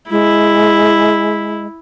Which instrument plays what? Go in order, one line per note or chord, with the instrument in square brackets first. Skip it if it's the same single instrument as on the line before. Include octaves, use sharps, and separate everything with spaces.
[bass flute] G#3 [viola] E4